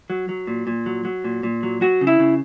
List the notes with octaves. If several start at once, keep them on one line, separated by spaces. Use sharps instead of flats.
F#3
F#3
A#2
A#2
F#3
F#3
A#2
A#2
F#3
F#3 F#4
C#3
E4
C#3